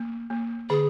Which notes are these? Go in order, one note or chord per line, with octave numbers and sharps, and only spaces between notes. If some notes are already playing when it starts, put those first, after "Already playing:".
Already playing: A#3
A#3
D3 G#4